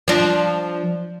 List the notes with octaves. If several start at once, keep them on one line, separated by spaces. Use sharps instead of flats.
F3 D4